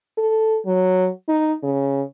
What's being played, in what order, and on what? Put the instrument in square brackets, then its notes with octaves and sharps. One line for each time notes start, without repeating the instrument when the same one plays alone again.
[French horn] A4
F#3
D#4
C#3